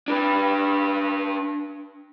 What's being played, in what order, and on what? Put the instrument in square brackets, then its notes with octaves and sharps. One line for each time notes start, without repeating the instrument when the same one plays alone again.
[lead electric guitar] D4 B4